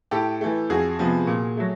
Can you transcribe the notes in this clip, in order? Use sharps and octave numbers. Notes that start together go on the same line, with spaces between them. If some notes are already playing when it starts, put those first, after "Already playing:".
A2 G4 A4
E3 A3
F2 F#4 G#4
C3 F3 G#3 B3
A#2
F#3 A3